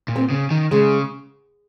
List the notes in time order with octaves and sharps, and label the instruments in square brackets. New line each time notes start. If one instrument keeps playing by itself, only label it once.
[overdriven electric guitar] A#2
[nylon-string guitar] C4
[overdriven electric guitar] C#3
D#3
[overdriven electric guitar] C#3 [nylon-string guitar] G#3